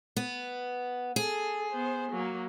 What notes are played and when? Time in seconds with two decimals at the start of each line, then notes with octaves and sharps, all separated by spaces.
0.16 B3
1.16 G#4 A4
1.73 B3 C5
2.12 F#3 A#3